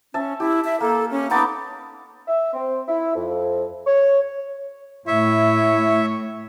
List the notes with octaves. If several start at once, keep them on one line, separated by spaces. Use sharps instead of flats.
C#4 E5 A5
E4 G4
E5
A#3 A4
C#4
B3 D#4 A5 D6
E5
C4
E4
F2
C#5
A2 E4 C#5 E5